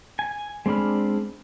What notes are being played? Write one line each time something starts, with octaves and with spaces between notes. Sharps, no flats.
G#5
G#3 C4 D4 B5 F6